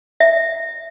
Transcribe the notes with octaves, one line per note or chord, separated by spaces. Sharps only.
E5